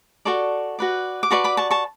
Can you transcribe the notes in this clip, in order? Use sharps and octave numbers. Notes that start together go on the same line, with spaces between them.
F#4 A4 D5 A5 C#6
F#4 B4 D5
D6
F#4 B4 D5 A5 C#6
B5 D6
A5 C#6
A5 C#6